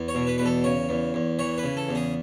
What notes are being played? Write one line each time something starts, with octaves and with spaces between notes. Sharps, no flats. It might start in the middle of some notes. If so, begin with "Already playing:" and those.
Already playing: E2
C#5
B2
B4
E2 B4
A4
C#3 C#5
E2
E2
E3 C#5
B4
C#3
A4
E2
G#4